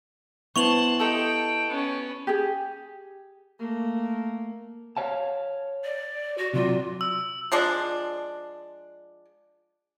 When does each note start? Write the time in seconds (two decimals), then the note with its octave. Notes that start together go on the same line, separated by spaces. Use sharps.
0.56 B3 E4 C5 A5 C#6 F7 F#7
1.00 D#4 G4 A4 G5
1.69 B3 C#4
2.27 G4 G#4
3.59 A3 A#3
4.97 C#5 F5 A5
5.84 D5
6.37 F#4
6.54 C3 F#3 F4 D5
7.01 E6
7.52 F3 G#3 D4